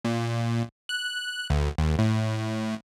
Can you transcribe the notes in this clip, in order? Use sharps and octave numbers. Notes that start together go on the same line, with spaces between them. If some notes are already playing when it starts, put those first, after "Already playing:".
A#2
F#6
D2
D#2
A2